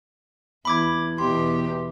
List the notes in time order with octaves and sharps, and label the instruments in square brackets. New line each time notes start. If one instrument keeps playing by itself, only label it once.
[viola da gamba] E2 [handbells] B5 D6 G#6
[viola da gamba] E2 B2 G4 [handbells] C6